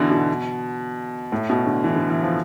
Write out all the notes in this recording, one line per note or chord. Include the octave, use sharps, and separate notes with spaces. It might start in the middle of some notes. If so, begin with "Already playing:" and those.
Already playing: B2 D3 E3
B2
A2
B2
D3
E3
D3
E3
F3